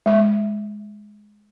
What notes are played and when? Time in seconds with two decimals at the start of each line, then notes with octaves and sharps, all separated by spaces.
0.06 G#3 E5